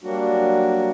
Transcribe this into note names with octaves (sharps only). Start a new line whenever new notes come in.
F#3 G3 A#3 D4 F#4